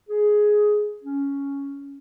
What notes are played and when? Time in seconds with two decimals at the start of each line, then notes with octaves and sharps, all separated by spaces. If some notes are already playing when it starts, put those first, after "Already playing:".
0.09 G#4
1.03 C#4